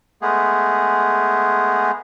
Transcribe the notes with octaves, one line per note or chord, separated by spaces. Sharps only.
G#3 A3 B3 G#4